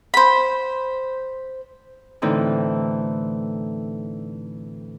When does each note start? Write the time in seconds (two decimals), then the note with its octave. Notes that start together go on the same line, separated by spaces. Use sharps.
0.14 C5 B5
2.22 A2 D3 E3 C4 D#4